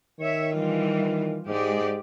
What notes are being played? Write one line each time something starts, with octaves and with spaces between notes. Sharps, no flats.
D#3 C#5 E5
E3 G3 F4
G#2 G#3 G4 D5